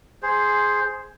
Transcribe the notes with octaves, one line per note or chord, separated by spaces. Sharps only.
G#4 C5